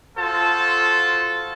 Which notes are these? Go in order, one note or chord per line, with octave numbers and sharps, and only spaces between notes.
F4 F#4 A4 C5 A5